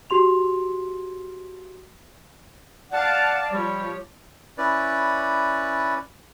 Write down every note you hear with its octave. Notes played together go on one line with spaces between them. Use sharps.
F#4 G4 C6 F7
D5 F5 F#5 A5
F3 G3 G4 C#5
C#4 E4 B4 D5